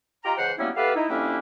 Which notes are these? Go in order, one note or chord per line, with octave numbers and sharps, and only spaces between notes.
F4 G4 D#5 G5 A#5
C#2 E3 C5 F#5
F#3 G3 A#3 B3 C#4 E4
B3 G4 A4 B4 E5 F5
D#4 E4
F2 G3 A#3 C#4 D4 E4